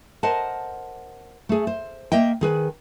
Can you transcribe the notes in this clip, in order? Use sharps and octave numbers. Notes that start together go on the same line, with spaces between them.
A#4 C5 D#5 F#5 A5
A3 G#4
C5
A#3 D#5 E5 G5
D#3 G#4 B4